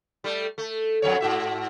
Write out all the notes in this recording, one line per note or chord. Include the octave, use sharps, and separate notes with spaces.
G3 A3
A3
F2 F#3 C#5
G#2 F#4 E5